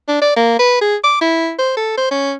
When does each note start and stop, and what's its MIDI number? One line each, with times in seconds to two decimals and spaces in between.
0.08 0.19 62
0.21 0.35 74
0.36 0.55 58
0.59 0.77 71
0.81 0.96 68
1.03 1.16 86
1.21 1.53 64
1.58 1.76 72
1.76 1.96 69
1.97 2.10 72
2.11 2.33 61